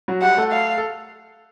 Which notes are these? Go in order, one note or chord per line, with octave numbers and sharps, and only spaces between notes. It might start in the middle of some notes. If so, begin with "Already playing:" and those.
F#3 F#4
G3 G4 F#5
A3 A4
F5
A4